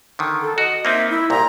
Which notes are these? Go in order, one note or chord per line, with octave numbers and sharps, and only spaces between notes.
D3 D#3
A4
F#4 D#5
A#3 C4 D#4 E5
E4
C2 A#2 A#5